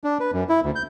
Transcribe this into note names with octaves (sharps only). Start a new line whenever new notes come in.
D4
B4
F#2
E4
D2
G6